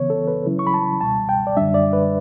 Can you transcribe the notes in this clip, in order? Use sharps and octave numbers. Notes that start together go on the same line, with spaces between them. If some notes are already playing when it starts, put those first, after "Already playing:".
Already playing: C#3 E3 B3 C#5
A4
B4
C#3 F#3 C#4 E4
C#6
B5
A5
C#2 B2 G3 A5
G5
D5
F#2 D3 G3 D4 E5
D5
B4